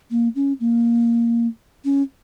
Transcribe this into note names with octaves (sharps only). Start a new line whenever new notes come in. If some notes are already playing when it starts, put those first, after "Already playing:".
A#3
C#4
A#3
C#4